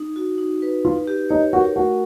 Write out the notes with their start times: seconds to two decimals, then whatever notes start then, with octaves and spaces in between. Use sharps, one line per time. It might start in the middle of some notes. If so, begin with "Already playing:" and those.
Already playing: D#4
0.16 F#4
0.38 D#4
0.62 B4
0.84 D#4 F4
1.07 G4
1.29 D#4 C#5
1.53 F#4 A#4
1.76 A3 F#4